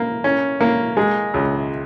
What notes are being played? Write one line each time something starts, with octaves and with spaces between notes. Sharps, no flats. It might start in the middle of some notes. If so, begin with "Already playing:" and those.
Already playing: A#3
C#4
A#3
G#3
C#2